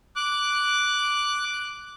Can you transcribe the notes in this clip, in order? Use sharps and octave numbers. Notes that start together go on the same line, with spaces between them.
D6 F#6